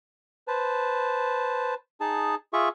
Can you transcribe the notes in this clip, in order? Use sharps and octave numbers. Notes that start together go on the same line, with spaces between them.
B4 C5 A5
D#4 G#4 A5
F4 G#4 E5 C#6